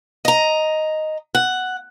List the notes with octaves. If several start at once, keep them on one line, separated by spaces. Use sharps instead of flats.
D#5 A#5
F#5